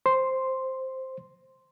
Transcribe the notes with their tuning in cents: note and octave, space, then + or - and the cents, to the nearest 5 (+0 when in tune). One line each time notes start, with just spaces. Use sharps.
C5 +0 C6 +0